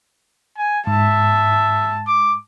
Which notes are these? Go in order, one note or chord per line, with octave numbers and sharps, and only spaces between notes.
G#5
G#2 E5 A5
D6